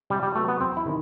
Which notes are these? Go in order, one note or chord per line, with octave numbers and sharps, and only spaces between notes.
C3 G3
G3
F#3 A3 B3 F#4
B3
E2 C4
E4
C3 D#3